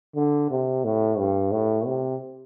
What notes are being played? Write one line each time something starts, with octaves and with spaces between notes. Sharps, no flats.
D3
C3
A2
G2
A2
C3